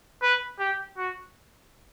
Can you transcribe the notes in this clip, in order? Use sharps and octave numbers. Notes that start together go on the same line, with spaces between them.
B4
G4
F#4